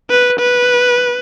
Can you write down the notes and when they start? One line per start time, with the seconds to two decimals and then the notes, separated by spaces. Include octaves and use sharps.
0.10 B4
0.39 B4